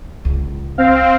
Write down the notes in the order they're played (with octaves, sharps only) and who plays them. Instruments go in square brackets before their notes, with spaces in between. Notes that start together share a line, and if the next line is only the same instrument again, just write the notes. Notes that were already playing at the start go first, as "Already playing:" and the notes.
[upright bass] C#2
[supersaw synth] C4 [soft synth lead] F5